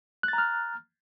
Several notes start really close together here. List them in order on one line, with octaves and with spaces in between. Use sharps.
F#6 A6 A#5 F6